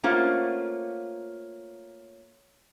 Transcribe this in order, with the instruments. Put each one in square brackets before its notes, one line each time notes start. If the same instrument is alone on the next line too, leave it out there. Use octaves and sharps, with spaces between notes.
[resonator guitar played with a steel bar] A3 A#3 C#4 F4 C5 F#5